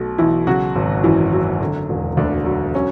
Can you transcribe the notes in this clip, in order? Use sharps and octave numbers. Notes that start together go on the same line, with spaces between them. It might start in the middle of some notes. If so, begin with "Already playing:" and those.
Already playing: B1 B2 A3
B1 E3 E4
C#3 F#3 F#4
G#1
F#2 E3 E4
F#3
D3
E1
D2 D3 D4
F#3
F#3 C#4